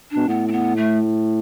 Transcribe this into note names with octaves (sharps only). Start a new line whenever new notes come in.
D4
B2
A2 B3
C4
B3
A3